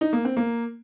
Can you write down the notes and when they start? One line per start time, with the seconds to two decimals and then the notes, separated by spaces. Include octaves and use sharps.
0.01 D#4
0.13 A#3
0.25 C4
0.37 A#3